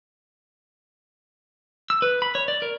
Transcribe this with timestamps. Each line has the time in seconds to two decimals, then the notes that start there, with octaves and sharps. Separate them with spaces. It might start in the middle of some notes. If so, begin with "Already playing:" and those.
1.90 E6
2.02 B4
2.22 B5
2.35 C#5
2.48 D5
2.62 A#4